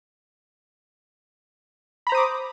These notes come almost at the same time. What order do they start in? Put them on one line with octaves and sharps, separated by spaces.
B5 A#5 C5 D#6 D6